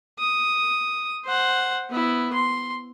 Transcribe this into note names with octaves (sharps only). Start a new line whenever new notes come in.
D#6
C5 F#5
B3 E4
C6